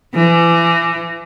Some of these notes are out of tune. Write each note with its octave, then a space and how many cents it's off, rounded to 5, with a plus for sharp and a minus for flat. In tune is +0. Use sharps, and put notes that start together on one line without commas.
E3 +35